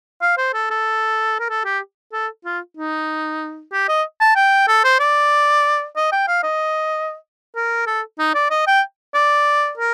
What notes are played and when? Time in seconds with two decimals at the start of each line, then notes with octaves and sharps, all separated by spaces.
0.22 F5
0.38 C5
0.54 A4
0.70 A4
1.40 A#4
1.49 A4
1.65 G4
2.13 A4
2.45 F4
2.77 D#4
3.72 G4
3.88 D#5
4.20 A5
4.36 G5
4.68 A4
4.85 C5
4.99 D5
5.96 D#5
6.12 G5
6.28 F5
6.43 D#5
7.56 A#4
7.87 A4
8.19 D#4
8.34 D5
8.50 D#5
8.67 G5
9.14 D5
9.78 A#4